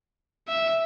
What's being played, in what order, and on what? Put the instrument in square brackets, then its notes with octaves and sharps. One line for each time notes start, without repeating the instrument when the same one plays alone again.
[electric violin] E5